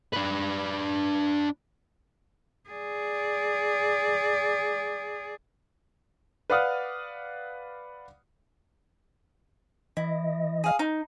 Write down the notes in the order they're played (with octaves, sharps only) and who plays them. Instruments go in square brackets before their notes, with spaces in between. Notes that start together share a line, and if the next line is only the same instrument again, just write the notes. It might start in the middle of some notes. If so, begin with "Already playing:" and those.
[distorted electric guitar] D4 B4
[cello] G#4 D5
[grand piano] B4 D5 F5 F#5 D#6 F6
[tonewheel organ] E3 D#5 [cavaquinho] E4
[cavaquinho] G#4 F5
D#4